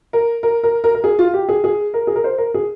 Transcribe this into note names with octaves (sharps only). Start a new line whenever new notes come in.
A#4
A#4
A#4
A#4
A#4
G#4
F4
G4
G#4
G#4
A#4
G#4
A#4
C5
A#4
G#4